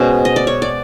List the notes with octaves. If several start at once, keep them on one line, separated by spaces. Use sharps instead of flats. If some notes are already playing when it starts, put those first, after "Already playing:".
Already playing: B2 G#3 C#4 C5
D#5
D5
C#5
D5